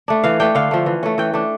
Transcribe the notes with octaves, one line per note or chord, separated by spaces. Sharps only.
A3 D4
E3 F5
A3 D4 G5
D3 F5
F3 A3
E3
A3 C#4
E3 G5
A3 D4